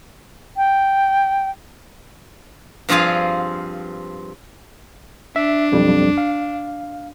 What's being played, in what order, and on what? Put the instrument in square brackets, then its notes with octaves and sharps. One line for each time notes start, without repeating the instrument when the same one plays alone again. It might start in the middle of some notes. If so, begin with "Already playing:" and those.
[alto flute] G5
[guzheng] G2 F3 C4 F4 G#4 F5
[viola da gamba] D4 [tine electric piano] E5
[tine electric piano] B1 F2 G3
F5